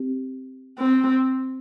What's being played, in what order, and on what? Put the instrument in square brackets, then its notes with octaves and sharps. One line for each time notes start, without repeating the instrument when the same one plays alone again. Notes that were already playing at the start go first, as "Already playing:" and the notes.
Already playing: [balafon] C4 G4
[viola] C4